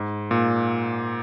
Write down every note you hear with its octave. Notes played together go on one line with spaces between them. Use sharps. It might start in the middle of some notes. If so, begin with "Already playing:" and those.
Already playing: G#2
A#2